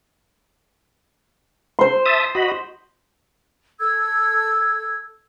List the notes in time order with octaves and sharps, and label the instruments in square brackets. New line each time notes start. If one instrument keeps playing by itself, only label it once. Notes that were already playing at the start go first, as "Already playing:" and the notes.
[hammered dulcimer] C5 C6
[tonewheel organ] E5 A5 D#6
F#4 D#5 B5
[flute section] A4 E6 G#6